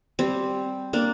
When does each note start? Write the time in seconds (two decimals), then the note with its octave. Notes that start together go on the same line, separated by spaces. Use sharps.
0.19 G3 C4
0.93 A#3 D4